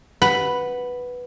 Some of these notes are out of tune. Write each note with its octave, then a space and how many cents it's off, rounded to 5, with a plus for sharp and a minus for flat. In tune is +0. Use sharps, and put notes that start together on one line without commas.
B4 +0 F#5 +0